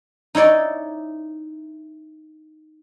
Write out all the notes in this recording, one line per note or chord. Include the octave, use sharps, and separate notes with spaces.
D#4 E4 C#5 D5 G#5